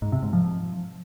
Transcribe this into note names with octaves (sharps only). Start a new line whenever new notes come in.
G#2
C3
G#2
F3